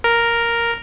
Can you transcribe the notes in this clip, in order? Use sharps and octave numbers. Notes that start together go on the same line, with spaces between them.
A#4